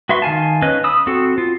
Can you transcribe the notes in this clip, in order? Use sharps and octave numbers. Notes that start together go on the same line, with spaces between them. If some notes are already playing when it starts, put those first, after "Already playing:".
F#4 B4 E5 C6 C#6
D#3 F5 G#5 A5
C#4 B4 D#5 F#6
B5 D#6 E6
C4 F#4 A4
F4